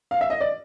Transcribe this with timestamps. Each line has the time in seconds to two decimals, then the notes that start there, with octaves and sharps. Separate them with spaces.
0.11 F5
0.21 E5
0.30 D#5
0.41 D5